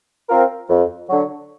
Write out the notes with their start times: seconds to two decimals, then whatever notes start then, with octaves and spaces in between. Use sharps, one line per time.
0.29 C4 F4 A#4
0.70 F2
1.08 D3 F#3